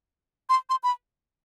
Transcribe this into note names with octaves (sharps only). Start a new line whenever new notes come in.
C6
C6
B5